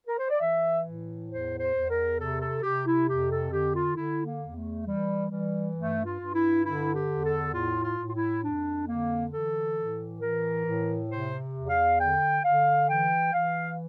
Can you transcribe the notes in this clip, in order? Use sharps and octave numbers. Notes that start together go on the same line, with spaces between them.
A#4
C5
D5
E3 E5
A2
E2 C5
C5
E2
A#4
C3 A4
A4
C3 G4
E4
F2 G4
A4
D3 G4
F4
D3 E4
A#3
E2
A3
E3 G3
E3 G3
G2 A3
F4
G2
E4
D3 E4
G4
E2
A4
A2 F4
F4
A2
F4
E4
F2 D4
D3 A#3
E3 A4
A2
E3 A#4
A2
C3 C5
E2
F5
D3 G5
D3 F5
E3 G5
E3 F5